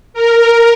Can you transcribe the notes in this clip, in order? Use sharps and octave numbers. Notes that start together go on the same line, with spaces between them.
A#4